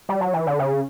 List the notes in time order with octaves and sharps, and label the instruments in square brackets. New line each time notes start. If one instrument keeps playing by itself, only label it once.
[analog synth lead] G3
F#3
E3
D3
C#3